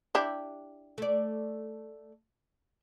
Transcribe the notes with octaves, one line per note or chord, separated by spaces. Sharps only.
D4 E4 G4
A3 D5